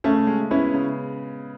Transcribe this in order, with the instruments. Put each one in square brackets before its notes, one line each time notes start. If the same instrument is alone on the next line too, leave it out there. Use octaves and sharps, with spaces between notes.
[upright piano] C#3 [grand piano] A3 C#4
[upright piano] G#3
[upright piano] B3 [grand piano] C#4 E4
[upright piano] C#3